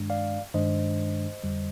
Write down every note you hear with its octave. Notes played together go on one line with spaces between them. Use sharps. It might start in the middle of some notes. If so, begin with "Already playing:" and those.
Already playing: G2 D#3 G#3 D4
D5 F5
G2 D#3 G#3 D4 C5 D#5
F2 D3 G3